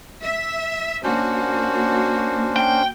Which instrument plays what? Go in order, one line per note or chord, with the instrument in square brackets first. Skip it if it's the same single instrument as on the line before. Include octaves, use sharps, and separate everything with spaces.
[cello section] E5
[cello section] A#3 F#4 [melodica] C#4 D4 C5
[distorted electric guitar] G5